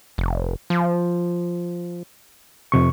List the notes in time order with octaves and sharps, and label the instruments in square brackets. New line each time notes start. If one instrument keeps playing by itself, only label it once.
[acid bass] F1
F3
[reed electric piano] F2 C3 C#6